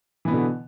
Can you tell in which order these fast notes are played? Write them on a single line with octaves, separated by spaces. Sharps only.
E3 B3 B2 D3